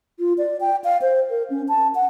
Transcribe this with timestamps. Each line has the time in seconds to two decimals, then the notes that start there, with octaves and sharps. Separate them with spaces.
0.20 F4
0.38 D5
0.61 G5
0.84 F5
1.02 C5
1.30 A#4
1.50 C#4
1.69 A5
1.95 F#5